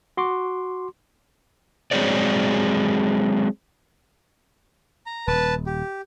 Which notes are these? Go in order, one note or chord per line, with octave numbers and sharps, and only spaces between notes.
F#4 C6 D6
F#3 G#3 C4 G#4 C#5 D5
A#5
D#1 B4 A5
G4